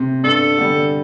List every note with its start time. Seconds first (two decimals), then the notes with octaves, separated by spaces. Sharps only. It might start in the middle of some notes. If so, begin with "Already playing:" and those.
Already playing: C3
0.24 G2 A4
0.58 D3 G3